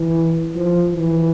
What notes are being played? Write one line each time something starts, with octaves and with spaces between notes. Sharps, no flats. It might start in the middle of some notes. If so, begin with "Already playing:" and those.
Already playing: E3
F3
E3